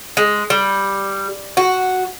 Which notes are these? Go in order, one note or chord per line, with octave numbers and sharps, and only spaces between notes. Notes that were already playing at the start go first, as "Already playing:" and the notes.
G#3
G3
F#4